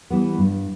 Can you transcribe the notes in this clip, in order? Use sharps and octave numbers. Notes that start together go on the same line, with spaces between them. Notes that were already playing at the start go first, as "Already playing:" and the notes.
E3 G3 B3
G2